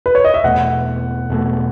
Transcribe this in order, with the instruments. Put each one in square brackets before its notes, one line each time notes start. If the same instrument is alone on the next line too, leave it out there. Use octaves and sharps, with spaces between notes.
[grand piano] B4
C#5
D#5
E5
[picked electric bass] E2 B2 A3 [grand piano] F#5
[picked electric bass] E2 B2 A3